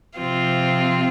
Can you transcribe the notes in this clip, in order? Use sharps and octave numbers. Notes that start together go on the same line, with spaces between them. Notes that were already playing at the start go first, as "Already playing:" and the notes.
C3 F3 C4 F4